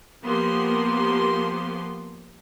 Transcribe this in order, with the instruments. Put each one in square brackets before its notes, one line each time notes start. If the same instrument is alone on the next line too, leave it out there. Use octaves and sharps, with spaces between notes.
[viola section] F3 A#3 B3 G4 C6